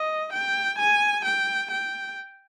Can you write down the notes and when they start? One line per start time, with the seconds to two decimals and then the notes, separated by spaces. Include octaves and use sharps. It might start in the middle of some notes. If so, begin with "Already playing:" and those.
Already playing: D#5
0.33 G5
0.79 G#5
1.25 G5
1.71 G5